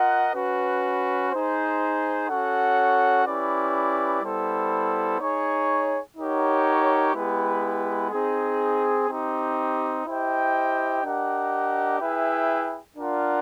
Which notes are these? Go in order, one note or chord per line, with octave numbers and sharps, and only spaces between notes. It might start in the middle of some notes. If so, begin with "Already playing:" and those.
Already playing: F4 A#4 D#5 F#5
C#4 F#4 B4
D#4 G#4 C5
C#4 F#4 A4 C#5 F#5
C#4 E4 G4 B4 D5
G3 B3 E4 A4 C5
D#4 G#4 C#5
D#4 G4 A#4 C#5 F#5
G#3 B3 E4 G4 B4
C4 D#4 G#4
C4 D#4 G4
E4 G4 C5 D#5 G5
D4 G4 A#4 D#5 F#5
E4 G#4 B4 E5 G5
D4 F4 A#4 D5 F#5